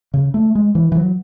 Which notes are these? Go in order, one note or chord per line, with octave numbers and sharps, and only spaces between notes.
C#3
A3
G#3
E3
E3
F#3